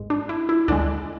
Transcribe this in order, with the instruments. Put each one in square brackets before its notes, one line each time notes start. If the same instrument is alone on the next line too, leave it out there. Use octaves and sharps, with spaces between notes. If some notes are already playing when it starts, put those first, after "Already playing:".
Already playing: [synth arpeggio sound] G#1 G#2 G#3
D4
E4
E4
D2 D3 G#3 D4